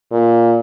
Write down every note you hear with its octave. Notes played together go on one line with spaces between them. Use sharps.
A#2